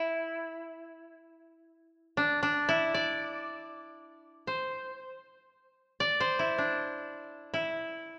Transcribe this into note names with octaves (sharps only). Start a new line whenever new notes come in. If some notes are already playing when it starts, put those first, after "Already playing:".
Already playing: E4
D4
D4
E4
D5
C5
D5
C5
E4
D4
E4